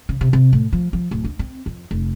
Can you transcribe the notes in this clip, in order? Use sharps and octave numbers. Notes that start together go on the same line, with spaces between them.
C#3
C3
C3
A2
F3
F3
D1
D4
C4
F2
F1